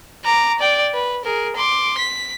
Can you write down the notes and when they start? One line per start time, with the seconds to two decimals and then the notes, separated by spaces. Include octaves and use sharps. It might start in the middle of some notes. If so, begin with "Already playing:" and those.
0.25 A#5 D6
0.59 D5 G5
0.94 B4
1.24 G#4 A#4
1.56 C6 D6
1.98 B6